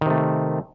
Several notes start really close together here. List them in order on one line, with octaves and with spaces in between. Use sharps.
D#3 C3 A3